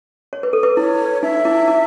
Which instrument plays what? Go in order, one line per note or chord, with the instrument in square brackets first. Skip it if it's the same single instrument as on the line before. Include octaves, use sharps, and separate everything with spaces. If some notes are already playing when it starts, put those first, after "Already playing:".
[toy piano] C#5
B4
A4
B4
[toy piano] E4 [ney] C#5
[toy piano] D#4 [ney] E5
[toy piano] E4
E4